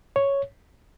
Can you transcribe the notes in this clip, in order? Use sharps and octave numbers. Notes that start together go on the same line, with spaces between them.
C#5